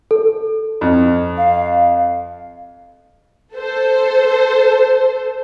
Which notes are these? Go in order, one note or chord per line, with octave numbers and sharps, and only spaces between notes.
A4
F2
F5
A4 C5